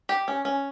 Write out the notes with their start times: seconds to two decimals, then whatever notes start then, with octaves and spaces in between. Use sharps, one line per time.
0.09 G4
0.28 C#4
0.45 C#4